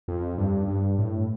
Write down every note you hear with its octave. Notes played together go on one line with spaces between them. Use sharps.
F2
G2
G2
A2